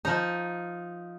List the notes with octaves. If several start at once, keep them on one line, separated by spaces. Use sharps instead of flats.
F3 D#4